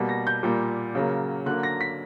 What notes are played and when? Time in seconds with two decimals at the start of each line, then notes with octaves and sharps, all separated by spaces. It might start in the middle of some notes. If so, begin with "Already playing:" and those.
Already playing: B2 G3 A#3
0.09 A#6
0.27 G6
0.43 A#2 G3 A#3
0.95 C#3 F#3 A#3
1.46 D3 F#3 A#3 F#6
1.63 A#6
1.81 B6